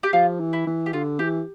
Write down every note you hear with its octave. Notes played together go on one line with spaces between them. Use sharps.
G4
F3 F4
E3
E4
E3
G4
D3 F4
E3 G4